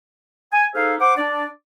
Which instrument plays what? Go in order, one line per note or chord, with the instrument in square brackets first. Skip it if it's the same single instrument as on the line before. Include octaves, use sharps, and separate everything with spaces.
[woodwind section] G#5
D#4 G#4 A4 C5 E5 F5
C5 F#5 D6
D4 D5